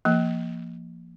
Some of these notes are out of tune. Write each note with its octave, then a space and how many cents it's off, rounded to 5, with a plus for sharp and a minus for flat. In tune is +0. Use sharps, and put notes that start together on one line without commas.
F3 -30 A#3 +0